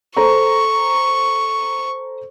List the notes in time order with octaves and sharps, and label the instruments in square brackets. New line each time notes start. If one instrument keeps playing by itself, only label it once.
[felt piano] A4 C5 A#5 [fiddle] C#6